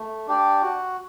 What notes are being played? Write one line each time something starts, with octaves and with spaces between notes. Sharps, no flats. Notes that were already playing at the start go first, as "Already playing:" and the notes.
Already playing: A3
D4 G4 D5
F#4